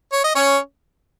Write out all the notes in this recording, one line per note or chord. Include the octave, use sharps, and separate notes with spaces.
C#5
D#5
C#4 C#5